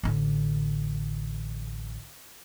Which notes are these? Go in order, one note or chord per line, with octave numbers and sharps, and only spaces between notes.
A1 D3